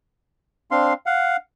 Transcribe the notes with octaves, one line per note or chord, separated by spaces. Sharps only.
C4 D4 F5 C6
F5 F#5